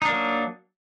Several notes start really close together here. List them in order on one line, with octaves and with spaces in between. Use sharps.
D#4 D4 A#3 F#3